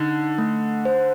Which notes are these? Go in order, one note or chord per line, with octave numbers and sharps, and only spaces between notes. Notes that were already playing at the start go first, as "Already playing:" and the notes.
Already playing: D3 D#4
A3
C5